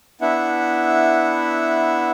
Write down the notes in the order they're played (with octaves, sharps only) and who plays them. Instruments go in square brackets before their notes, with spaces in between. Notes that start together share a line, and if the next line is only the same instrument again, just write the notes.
[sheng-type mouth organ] B3 D4 E4 E5 F#5